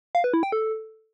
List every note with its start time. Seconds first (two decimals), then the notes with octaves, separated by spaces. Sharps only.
0.15 F5
0.24 B4
0.34 E4
0.43 G5
0.52 A4